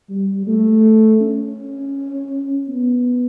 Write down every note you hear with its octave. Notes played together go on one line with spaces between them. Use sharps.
G3
A3
C#4
B3